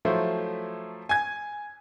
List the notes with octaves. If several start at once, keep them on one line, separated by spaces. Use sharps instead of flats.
F3 F#3 A3 E4 C5
G#5 G#6